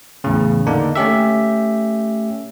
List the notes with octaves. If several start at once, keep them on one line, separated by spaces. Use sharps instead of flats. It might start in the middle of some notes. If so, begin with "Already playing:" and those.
E2 A2 C#3
D3 A#3 D4 D#4
A3 C#4 G4 E5